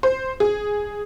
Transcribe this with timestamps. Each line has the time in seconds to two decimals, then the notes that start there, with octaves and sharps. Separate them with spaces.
0.03 C5
0.40 G#4